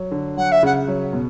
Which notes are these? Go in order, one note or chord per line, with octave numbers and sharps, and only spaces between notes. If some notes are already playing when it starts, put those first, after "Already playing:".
Already playing: F#3
D3
F#3 F#5
E5
C#3 F#5
F#3
B2